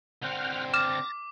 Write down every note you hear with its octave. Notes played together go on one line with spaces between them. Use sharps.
D3 C4 F#5 G5 F6
D6 F6 A6 A#6 E7